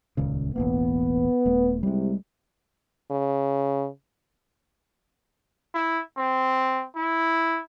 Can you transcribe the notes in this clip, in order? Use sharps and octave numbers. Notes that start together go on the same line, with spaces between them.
D#1 C#2 C#3
E1 A1 A#3 B3
D#1 A3
C2 C3 G3 G#3
C#3
E4
C4
E4